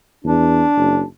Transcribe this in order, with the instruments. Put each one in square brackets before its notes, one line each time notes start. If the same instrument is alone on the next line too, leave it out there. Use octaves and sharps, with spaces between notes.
[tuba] E2 [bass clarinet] D4
[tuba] F#1